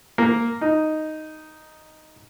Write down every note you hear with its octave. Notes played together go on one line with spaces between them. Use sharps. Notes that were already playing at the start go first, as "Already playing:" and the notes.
A#3
D#4